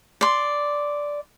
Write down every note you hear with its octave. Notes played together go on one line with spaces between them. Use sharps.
D5 C6